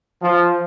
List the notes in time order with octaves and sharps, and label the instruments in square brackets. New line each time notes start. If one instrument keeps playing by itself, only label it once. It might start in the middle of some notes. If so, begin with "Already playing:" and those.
[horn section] F3